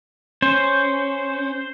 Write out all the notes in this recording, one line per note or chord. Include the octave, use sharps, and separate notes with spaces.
C#4 C5